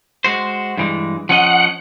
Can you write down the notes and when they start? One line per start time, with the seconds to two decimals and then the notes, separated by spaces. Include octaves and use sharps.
0.24 G#3 F#4 C5
0.78 G2 E3 G#3
1.29 F3 C#4 D#5 F#5